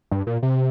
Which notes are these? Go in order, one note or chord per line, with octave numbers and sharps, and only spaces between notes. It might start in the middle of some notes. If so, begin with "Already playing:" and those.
G2
A#2
C3